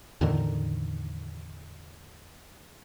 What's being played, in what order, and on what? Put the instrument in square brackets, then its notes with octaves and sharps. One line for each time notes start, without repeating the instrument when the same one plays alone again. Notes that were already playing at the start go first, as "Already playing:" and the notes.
[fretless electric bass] E2 A2 D3 D#3